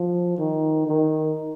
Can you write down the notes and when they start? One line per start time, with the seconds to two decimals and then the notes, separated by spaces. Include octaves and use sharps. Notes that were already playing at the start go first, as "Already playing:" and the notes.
Already playing: F3
0.38 D#3
0.87 D#3